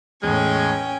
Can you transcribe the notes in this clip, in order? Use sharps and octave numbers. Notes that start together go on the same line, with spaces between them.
E2 A2 G#3 C#4 G5 G#5